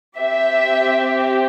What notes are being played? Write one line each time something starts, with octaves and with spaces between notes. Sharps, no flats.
C4 G4 E5